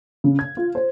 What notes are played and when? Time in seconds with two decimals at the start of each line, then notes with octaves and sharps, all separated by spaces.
0.24 C#3
0.39 G#6
0.57 F4
0.75 C5